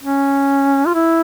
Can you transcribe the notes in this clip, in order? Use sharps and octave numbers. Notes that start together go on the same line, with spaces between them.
C#4
F4
E4